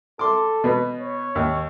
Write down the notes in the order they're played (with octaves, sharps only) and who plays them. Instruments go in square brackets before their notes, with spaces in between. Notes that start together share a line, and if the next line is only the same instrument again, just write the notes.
[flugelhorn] A4 [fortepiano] C6 D6
[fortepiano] B2 B3
[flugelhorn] C#5
[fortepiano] D#2